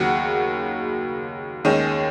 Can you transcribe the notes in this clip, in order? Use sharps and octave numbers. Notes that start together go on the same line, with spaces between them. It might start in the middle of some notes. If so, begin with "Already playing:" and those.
Already playing: D#2 C#3 F#3 F#5
D#2 D#3 G#3 C#4